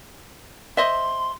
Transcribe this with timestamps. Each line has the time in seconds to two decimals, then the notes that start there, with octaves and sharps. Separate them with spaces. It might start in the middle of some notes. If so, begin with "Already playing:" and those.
0.77 C5 D#5 E5 C6